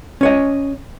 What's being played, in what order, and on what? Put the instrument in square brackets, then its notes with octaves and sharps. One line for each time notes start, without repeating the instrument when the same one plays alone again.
[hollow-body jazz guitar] C#4 C#5 D#5